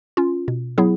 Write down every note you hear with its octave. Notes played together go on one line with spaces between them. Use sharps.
C#4 F4
B2
F#3 B3 E4 G#4